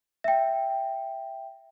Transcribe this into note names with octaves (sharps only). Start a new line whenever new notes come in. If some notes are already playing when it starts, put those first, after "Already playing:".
E5 G5